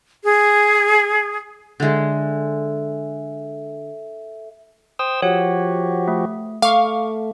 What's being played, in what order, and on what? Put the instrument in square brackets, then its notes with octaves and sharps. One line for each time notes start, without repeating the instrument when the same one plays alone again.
[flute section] G#4
[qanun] D3 G#3 [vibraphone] A4 E5
[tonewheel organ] C5 G5 E6 [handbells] D#6
[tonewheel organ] F3 F#4 G4 [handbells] C#5 F#5
[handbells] A3
[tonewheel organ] A3 [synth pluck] F5 [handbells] C#6 D6